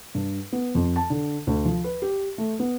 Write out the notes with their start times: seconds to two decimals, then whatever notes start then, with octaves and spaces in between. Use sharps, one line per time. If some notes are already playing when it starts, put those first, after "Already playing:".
0.15 G2
0.53 B3
0.75 F2
0.96 A5
1.10 D3
1.47 D2
1.65 F3
1.84 B4
2.02 G4
2.38 A3
2.60 B3